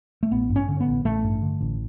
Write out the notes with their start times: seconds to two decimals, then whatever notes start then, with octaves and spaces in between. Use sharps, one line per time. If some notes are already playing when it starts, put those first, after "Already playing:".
0.23 A3
0.31 A1 B3
0.50 G2
0.56 C#4
0.69 D3
0.80 B3
0.87 A1
1.05 A1 A3
1.24 G2
1.42 D3
1.61 A1